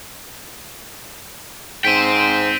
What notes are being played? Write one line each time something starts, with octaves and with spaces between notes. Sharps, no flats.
G#2 C5 G5 B6 D7 D#7